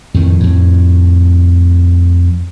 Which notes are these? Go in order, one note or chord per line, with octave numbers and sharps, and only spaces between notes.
F2 A2 D#3
F2 A2